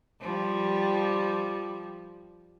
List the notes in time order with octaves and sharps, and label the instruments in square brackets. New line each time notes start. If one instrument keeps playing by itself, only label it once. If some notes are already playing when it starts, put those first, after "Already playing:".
[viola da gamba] F3 G3